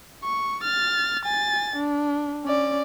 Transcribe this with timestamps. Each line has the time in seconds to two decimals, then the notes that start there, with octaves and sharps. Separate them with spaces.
0.23 C#6
0.64 F6 A6
1.24 G#5 A6
1.76 D4
2.45 C#4 D5